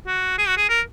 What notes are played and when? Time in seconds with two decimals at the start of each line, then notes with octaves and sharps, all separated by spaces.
0.07 F#4
0.39 G#4
0.48 F#4
0.57 G#4
0.69 A#4